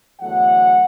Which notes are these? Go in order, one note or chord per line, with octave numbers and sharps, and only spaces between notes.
E2 D3 F#3 A3 F#5